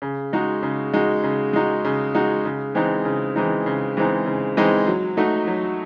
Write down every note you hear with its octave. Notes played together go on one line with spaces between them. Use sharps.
C#3
G#3 D#4 F#4
C#3
G#3 D#4 F#4
C#3
G#3 D#4 F#4
C#3
G#3 D#4 F#4
C#3
E3 G#3 C4 D#4
C#3
E3 G#3 C4 D#4
C#3
E3 G#3 C4 D#4
C#3
E3 G#3 C4 D#4
F#3
A3 D#4 F#4
F#3